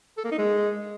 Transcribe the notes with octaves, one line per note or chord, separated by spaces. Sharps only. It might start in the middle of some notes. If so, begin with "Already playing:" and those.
A4
A#3
D#4
G#3